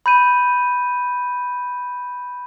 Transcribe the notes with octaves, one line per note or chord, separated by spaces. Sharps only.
B5 G6 D#7